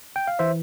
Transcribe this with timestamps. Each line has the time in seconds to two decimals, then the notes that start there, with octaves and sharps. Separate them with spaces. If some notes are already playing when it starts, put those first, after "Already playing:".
0.16 G5
0.27 F5
0.39 E3 C5 E5